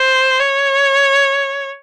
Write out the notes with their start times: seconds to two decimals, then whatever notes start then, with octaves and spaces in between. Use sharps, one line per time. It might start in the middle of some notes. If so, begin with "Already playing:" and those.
Already playing: C5
0.39 C#5